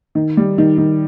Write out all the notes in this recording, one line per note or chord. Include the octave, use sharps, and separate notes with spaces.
D#3
G3
D#3
D#3